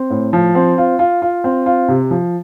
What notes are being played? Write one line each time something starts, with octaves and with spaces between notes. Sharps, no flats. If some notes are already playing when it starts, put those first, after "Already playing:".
Already playing: C4
A2
F3
C4
F4
F4
F4
C4
F4
C3
F3